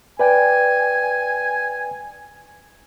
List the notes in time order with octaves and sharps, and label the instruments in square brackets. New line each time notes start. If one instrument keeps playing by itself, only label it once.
[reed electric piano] B4 D5 G5 [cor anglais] G#5